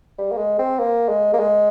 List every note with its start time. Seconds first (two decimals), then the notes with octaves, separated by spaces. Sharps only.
0.18 G3
0.32 A#3
0.37 G#3
0.59 C4
0.79 A#3
1.08 G#3
1.34 A#3
1.39 G#3